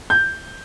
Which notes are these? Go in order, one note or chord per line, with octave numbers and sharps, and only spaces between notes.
G6